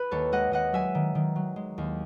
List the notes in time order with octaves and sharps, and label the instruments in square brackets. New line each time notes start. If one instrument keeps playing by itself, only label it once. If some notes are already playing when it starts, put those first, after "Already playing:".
Already playing: [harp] B4
D#2 A4 C#5
G#3 D#5 F#5
D#2 D#5 F#5
F#3 E5 G#5
D#3
D#3
F#3
G#3
D#2